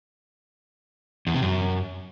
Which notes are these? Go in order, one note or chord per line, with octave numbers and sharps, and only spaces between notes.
E2
C3
F#2